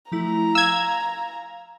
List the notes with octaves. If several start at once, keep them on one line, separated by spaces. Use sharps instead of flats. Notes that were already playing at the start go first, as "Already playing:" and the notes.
F3 A3 E4 A#5
F5 G#5 E6 G#6